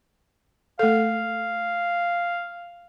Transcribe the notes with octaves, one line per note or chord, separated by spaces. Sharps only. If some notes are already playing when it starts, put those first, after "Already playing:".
A3 A4 F5